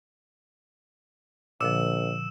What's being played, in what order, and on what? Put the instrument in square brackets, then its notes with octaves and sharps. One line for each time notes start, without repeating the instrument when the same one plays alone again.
[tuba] A#1 [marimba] A#2 D3 F3 [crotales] E6 E7